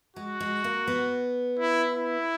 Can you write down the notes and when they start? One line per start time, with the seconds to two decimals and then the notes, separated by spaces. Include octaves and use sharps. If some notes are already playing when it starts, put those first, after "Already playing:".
0.16 G#3 F#4
0.40 G#3
0.64 A#3
0.87 B3
1.59 E4
1.94 E4